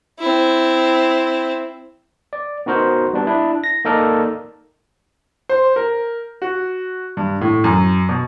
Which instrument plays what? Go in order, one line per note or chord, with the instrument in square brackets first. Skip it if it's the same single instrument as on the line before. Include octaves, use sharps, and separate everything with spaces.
[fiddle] C4 E4
[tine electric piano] D5
B3 D#4 F#4 A#4 C5
G3 B3 D4
D4 E4
A#6
A#3 D#4 A4 A#4 D5
[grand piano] C5
A#4
F#4
G2
A2
F#2
B2